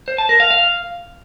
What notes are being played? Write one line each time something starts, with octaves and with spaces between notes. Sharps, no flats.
C5
A5
A#4
F5
F5